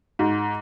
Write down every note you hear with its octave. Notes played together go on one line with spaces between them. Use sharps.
G#2